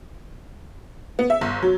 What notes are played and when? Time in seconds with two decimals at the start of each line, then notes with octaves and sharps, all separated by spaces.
1.19 B3
1.30 E5
1.41 G1
1.63 F#3